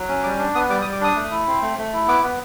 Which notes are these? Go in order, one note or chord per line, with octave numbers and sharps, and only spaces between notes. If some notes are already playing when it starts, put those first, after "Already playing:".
Already playing: F#3
C#4
G3 D6
D4
B3 D#6
G3 D6
D#6
G3
D6
D4 D#6
A3
E4
C4
A3
A3
E4
B3 D6
B3